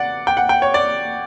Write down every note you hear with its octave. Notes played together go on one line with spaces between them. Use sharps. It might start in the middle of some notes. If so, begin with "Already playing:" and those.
Already playing: D5 F#5
G5
F#5
G5
C#5
D5